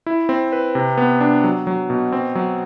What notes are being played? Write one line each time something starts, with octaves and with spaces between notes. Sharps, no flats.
E4
C4
B4
C3
B3
D4
F#3
F#3
B2
C4
F#3